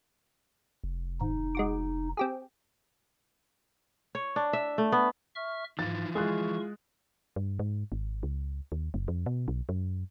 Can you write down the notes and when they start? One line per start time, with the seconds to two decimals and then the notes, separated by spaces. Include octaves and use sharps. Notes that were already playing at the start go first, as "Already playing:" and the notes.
0.84 F1
1.21 G#1 D#4
1.55 G#3 F#4 D6
2.17 C4 G4 G#4
4.15 C#5
4.36 D4
4.53 E5
4.78 A3
4.92 B3
5.36 E5 C#6 F6
5.79 G#2 E3 F3 F4 A6
6.15 G#3 E4 F4 G#4 C#6 F#6
7.36 G2
7.59 G#2
7.92 G#1
8.23 C#2
8.72 D#2
8.94 F#1
9.08 F2
9.26 B2
9.48 B1
9.69 F#2